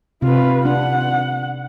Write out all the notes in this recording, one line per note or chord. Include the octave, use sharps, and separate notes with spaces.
C3 F4 B4
D4 F#5